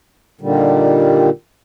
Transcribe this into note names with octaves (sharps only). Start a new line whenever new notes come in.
A#2 D3 D#3 G3